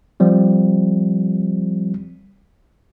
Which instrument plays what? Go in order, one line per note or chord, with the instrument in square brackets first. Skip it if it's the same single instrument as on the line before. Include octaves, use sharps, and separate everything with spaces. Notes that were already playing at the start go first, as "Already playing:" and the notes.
[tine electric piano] F3 G3 C4